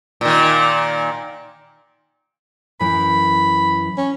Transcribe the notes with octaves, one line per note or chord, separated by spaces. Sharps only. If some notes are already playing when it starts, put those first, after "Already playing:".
A#2 D#3
F#2 E3 B5
C#4